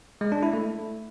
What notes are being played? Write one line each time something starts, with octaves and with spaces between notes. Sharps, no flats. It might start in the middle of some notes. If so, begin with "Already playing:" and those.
G#3
D4
E4
A3